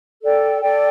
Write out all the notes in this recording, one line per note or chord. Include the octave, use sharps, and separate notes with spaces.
A4 D5 G5
A4 D5 G5